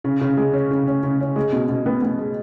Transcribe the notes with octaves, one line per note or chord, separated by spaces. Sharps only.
C#3
C#3
G#3
C#4
C#3
C#4
C#3
C#4
G#3
B2
B2
B3
B3
G#3